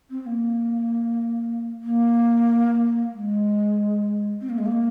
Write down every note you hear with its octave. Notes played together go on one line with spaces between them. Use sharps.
C4
C4
A#3
A#3
G#3
C4
A#3
G#3
A#3